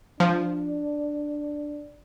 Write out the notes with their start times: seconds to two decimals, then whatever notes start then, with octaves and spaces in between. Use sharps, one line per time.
0.20 F3 D4